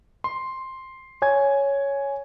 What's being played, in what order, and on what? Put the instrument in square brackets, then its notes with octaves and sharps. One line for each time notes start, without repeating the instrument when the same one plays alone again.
[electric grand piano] C6
C#5 G#5 G#6